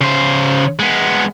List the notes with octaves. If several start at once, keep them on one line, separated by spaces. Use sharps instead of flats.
C#3 C5
G#3 B3